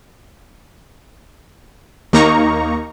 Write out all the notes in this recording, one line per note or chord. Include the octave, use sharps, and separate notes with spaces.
D#2 A#3 D#4 A#5 C#6